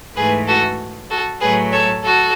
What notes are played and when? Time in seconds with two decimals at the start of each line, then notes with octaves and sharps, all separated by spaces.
0.16 G#2 E3 A3 G#4 B4
0.47 F#4 A4
1.10 F#4 A4
1.40 A2 F#3 A3 G#4 B4
1.72 A4 C#5
2.04 F#4 A4